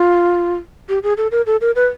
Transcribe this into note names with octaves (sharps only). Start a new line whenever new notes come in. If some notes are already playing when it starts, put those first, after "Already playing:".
Already playing: F4
G4
G#4
A4
A#4
A4
A#4
B4